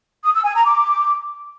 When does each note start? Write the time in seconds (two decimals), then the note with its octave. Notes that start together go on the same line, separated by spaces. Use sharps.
0.24 D#6
0.34 E6
0.45 G#5
0.55 A#5
0.65 D6